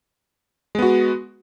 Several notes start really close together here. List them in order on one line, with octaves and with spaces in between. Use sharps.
G#3 B3 F#4